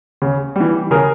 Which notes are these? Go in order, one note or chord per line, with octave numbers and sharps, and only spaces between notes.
C#3
E3 G3
C#3 G#4 A#4